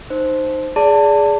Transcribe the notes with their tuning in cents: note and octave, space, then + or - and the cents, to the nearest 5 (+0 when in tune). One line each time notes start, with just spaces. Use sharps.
D#4 -10 C5 +0
G#4 +0 D5 -20 A5 +20